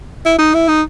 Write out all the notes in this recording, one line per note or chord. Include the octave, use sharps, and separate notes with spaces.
E4
D#4
E4
D#4